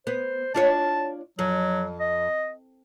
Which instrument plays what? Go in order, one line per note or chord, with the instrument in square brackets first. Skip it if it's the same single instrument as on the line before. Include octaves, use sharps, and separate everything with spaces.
[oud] B3 [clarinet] C5
[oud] D4 F4 C#5 [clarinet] A5
[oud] F2 [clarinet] F#3
[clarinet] D#5